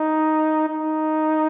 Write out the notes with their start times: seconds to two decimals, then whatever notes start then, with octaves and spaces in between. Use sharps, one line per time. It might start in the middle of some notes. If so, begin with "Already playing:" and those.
Already playing: D#4
0.69 D#4